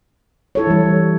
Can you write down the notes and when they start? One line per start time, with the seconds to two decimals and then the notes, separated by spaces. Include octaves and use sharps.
0.55 E4 A4 C#5
0.67 E3 G3